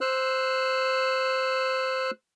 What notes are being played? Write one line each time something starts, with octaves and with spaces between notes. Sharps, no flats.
C5 E6 F#6